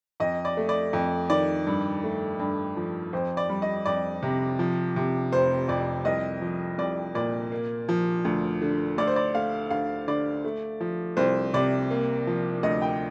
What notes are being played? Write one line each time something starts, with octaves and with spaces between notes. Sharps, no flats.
F2 D#5
D5
A3
D5
F2
D#3 D5
G2
A3
G2
F3
F2 C5
D5
G3
D#5
F2 D5
C3
F3
C3
F1 C5
F2 D5
C2 D#5
F3
C2 D5
A#2 D5
A#3
F3
D2
D3
D2 D5
C5
D5
A3 F5
D2 F5
D3 D5
A3
F3
C2 C5
C3 D5
A#3
F3
D2 D#5
G5